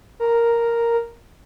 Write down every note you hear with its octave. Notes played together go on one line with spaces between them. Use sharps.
A#4